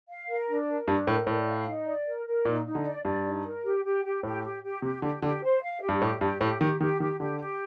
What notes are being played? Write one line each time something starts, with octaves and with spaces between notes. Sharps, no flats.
F5
A#4
D4
A#4
G2 D4
A2 A#4
A2 D5
F5
D#4
D5
A#4
A#4
A#2 D#4
D#4
D3
D5
G2 D5
D#4
A#4
G4
G4
G4
A2 G4
G4
G4
C3 G4
D3 G4
D3 G4
C5
F5
G4
G2
A2 G4
G2 G4
A2 G4
D#3 G4
D#3 G4
D#3 G4
D3 G4
G4